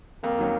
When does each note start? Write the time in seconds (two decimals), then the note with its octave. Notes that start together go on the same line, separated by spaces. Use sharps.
0.23 F2 A#3
0.39 D#3 F#3 C#4